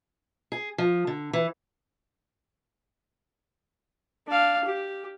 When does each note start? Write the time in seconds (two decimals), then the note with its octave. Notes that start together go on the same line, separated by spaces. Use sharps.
0.52 G#4
0.78 F3
1.07 D3
1.33 E3
4.28 D4 F5
4.64 G4